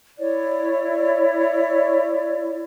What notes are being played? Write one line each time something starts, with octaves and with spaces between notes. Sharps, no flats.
E4 C#5 D5